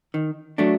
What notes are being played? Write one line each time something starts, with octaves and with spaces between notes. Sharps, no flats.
D#3
F#3 A3 D4